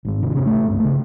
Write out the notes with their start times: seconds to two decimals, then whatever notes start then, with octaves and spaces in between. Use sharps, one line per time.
0.05 G#1 G#2
0.23 G#1 E2 C3
0.34 A2 C3 C#4 D4
0.47 A1 A3
0.68 C2 G2
0.80 C#3 A3